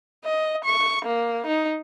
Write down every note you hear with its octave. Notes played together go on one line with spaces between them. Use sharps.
D#5
C#6
A#3
D#4